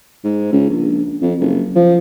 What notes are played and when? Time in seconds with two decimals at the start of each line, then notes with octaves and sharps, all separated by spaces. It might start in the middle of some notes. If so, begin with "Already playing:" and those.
0.24 G#2
0.53 C#2
0.70 A#1
1.22 F2
1.40 F#1
1.75 F3